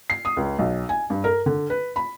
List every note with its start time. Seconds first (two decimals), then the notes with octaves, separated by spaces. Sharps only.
0.10 C7
0.25 D#6
0.37 C#2
0.59 B1
0.89 G#5
1.10 G2
1.24 A#4
1.46 D3
1.70 B4
1.96 B5